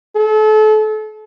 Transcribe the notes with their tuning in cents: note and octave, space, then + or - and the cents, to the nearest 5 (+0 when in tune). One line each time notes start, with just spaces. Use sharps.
A4 -35